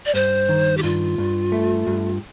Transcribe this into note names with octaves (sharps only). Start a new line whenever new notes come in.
D5
G2 C5
D#3
G4
G2 F4
G2
A3
G2